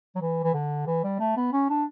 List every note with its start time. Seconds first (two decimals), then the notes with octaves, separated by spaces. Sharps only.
0.15 F#3
0.21 E3
0.44 E3
0.54 D3
0.87 E3
1.04 G3
1.20 A3
1.37 B3
1.53 C#4
1.70 D4